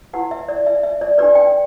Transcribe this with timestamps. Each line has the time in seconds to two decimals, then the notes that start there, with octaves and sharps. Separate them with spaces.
0.13 E4 G4 B4 F#5
0.31 E5
0.48 D5
0.67 E5
0.83 E5
1.01 D5
1.18 D4 G4 B4 D5
1.35 G5